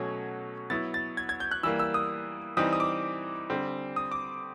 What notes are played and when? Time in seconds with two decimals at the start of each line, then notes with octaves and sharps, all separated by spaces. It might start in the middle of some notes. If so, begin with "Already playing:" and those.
Already playing: B2 F#3 A3 C#4 G#6
0.70 F#3 B3 E4 A6
0.94 A6
1.17 G#6
1.29 G#6
1.40 G6
1.51 F#6
1.63 E3 G3 A#3 E6
1.79 E6
1.94 D#6
2.57 E3 G3 C4 D#4 D#6
2.73 D#6
2.80 D6
3.50 D3 G3 C4
3.96 D#6
4.12 D6